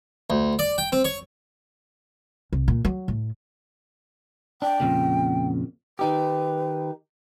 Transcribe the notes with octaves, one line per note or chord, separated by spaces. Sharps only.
D2
D5
G5
C4
C#5
C2
A#2
F#3
A2
D4 G5
F2 A#2 C#3
D#3 D#4 G4 B4